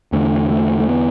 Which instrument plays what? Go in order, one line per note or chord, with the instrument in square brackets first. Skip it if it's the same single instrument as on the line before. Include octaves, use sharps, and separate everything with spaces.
[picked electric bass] E2 D3 A3
A3
A3
B3